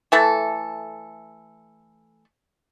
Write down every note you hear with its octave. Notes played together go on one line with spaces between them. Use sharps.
E3 A3 A4